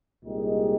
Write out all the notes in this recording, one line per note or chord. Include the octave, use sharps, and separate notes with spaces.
C2 A#2 G#3 D#4 G4